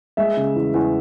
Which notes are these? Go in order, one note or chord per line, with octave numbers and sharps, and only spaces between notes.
G#3 E5
C#3
E2
E2